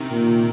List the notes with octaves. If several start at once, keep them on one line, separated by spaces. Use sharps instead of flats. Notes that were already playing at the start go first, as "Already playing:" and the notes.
Already playing: C3 D#3
A#2